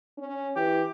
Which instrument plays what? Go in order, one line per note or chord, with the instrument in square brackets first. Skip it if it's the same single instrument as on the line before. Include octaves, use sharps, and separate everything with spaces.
[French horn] C#4
[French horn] E3 [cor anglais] G4